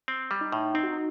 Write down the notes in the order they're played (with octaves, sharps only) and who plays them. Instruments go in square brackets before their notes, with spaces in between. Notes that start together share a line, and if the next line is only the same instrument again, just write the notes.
[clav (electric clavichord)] C4
G3
[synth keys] D#4
[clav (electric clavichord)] A2
[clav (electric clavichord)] C4 [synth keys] D#4
[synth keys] F#4
D#4